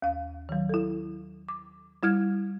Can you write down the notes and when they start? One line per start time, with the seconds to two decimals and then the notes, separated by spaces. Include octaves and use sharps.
0.02 D#2 F5
0.49 D#3 F#3
0.69 E4 A4
1.49 D6
2.03 G3 E4 F6 G#6